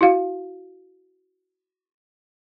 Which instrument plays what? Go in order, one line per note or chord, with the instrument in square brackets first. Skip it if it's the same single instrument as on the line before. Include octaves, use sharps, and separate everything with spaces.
[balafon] E4 F#4 F5